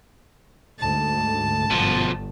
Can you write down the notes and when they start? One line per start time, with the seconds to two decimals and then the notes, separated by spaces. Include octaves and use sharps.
0.79 D2 G#2 A5
1.70 G1 B2 F3